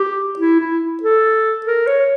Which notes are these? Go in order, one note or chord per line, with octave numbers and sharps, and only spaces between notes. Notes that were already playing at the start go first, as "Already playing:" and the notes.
Already playing: G4
E4
E4
A4
A#4
C#5